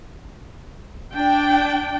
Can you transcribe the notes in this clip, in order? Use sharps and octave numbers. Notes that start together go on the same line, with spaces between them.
D4 G5